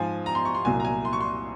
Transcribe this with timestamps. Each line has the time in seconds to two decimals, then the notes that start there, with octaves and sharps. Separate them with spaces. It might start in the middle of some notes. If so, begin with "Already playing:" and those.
Already playing: G#2 F3 G#5
0.26 A#5
0.35 C6
0.45 C#6
0.55 C6
0.65 C2 A#2 F#3 G#5
0.80 A#5
0.85 G#5
1.05 C6
1.13 C#6
1.20 C6